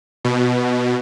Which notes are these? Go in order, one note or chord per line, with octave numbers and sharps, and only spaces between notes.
B2